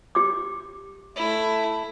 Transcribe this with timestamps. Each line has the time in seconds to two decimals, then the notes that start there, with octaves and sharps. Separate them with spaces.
0.15 G4 D6
1.16 A3 E4